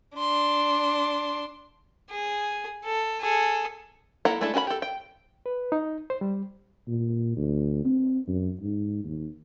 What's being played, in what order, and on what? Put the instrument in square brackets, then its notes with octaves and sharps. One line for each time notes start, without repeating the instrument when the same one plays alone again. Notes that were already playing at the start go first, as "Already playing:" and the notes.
[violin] D4 C6
[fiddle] G#4
A4
G#4 A4
[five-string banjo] A#3 E4 A4 F#5 A#5
G#3 A3 D4 E4 A4
C#4 F#4 A#4 F#5 B5
G4 A4
G5
[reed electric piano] B4
D#4
C5
G3
[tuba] A#2
D2
C4
F#2
G#2
D#2